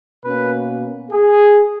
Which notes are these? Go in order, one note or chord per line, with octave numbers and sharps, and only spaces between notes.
B2 A#3 C#4 B4
G#4